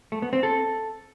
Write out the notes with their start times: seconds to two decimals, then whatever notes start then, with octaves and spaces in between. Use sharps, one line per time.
0.12 A3
0.22 B3
0.33 C4
0.43 A4